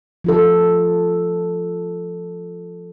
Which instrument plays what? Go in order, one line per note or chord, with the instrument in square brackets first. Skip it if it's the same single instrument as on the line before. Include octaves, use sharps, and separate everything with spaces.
[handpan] F3 F4 A4